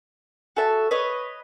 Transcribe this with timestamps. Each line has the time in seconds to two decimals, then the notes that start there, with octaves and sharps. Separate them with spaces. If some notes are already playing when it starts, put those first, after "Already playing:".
0.56 F#4 A4 E5 A5
0.91 B4 C#5 D#5